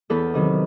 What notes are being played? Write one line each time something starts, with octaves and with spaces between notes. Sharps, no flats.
E2 A4 B4
C3 D#3 F#3